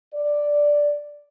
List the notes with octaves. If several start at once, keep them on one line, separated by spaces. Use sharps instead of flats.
D5